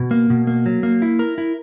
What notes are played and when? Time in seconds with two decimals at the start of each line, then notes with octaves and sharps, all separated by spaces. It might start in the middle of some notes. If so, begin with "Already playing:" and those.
Already playing: B2
0.11 A#3
0.30 B2
0.47 A#3
0.66 F#3
0.83 A#3
1.02 E4
1.19 A#4
1.38 E4